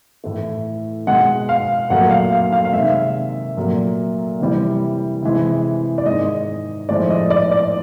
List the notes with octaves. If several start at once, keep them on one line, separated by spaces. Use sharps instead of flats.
A2 E3 A3
B2 G#3 F#5
F5
A#2 F#3 A3 F#5
F5
F5
F5
F5
C3 D#3 G#3 E5
A#2 F#3 A3
C3 E3 G3
C3 E3 G#3
D5
G#2 D#3 G#3 D#5
A2 F3 G#3 D5
D#5
D5
D5